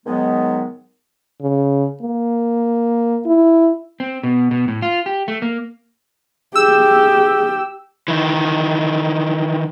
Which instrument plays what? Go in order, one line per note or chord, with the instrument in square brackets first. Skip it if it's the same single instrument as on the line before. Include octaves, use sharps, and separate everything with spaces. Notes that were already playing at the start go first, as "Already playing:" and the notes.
[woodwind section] G#2 D#3 F#3 G#3 B3
[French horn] C#3
A#3
E4
[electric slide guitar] C4
B2
B2
A2
F4
G4
A3
A#3
[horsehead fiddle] G4 [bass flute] G#4 [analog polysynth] E6
[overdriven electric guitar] D#3 E3